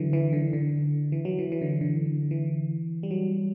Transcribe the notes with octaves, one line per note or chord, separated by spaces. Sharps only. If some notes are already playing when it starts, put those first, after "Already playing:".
Already playing: D3 E3 F#3
E3
D3
D3
E3
F#3
E3
E3
D3
D3
E3
G3
F#3